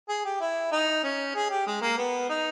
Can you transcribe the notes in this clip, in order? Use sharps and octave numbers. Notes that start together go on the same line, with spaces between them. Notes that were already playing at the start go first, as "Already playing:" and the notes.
G#4
G4
E4
D#4
C#4
G#4
G4
G#3
A#3
B3
D#4